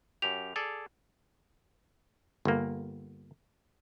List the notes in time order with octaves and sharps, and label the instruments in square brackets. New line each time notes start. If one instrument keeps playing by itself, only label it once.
[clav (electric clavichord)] F#2 G4 [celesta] F7
[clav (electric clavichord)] G#4 A4 D5
G1 A#3